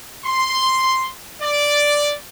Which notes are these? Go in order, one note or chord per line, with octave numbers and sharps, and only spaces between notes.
C6
D5